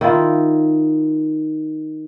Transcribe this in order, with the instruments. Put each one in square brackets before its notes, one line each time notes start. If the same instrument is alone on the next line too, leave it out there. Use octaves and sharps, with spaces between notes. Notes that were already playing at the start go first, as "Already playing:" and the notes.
[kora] D#3 E4 F4